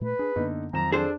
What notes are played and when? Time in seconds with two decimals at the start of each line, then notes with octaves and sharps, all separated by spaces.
0.01 A#2 A3 B4
0.19 D4 G#4
0.36 F#2 D3 A#3 B3 D#4
0.73 F2 D#3 F#3 A#5 E7
0.92 D4 G#4 A4 C5